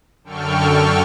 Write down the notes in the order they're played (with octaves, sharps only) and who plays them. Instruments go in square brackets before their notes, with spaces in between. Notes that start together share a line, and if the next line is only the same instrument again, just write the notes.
[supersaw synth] F#2 D3 A4 G5 C#6 F6